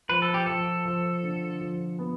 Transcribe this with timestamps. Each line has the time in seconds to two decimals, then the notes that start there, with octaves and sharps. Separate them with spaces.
0.09 F3 B4
0.22 A4
0.34 G4
0.46 F3 A4
0.85 F3
1.23 D3
1.61 F3
1.99 B3